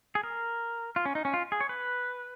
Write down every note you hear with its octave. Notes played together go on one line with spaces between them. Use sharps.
G#4
A#4
F4
C#4
D#4
C#4
F4
G#4
C#5
B4